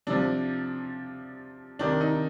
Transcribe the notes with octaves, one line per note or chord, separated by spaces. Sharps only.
C3 F3 D4
C3 D#3 D4
D#4